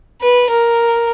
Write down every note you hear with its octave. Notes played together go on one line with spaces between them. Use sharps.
B4
A#4